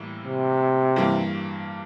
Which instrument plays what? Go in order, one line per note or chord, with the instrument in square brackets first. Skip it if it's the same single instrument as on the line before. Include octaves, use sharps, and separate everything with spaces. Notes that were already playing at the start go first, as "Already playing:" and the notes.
Already playing: [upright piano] A2 E3 G3 A#3 E4
[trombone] C3
[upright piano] G2 E3 G3 A#3